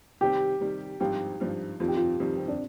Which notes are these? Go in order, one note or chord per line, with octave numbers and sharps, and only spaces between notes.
C3 D#3 G3 G4
C3 D#3 G3
G#1 G2 F3 C4 F4 G4
G#1 G2 F3 C4 F4
F2 C3 D#3 G3 F4
G4
F4
F2 C3 D#3 G3
C4
D4